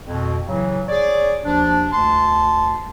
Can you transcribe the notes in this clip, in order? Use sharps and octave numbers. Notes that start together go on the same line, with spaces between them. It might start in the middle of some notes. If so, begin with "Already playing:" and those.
F2 B2
A2 C#3 E3 F#3
G#4 C#5 D5
D#2 F3 D4
D2 A5 C6